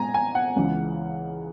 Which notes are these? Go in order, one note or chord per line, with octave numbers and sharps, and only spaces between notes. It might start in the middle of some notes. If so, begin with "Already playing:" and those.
Already playing: A#2 G#3 G#5 A#5
G#5
F#5
C#2 C#3 E3 G#3